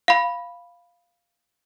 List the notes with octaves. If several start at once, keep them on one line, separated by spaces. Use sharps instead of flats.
F5 B5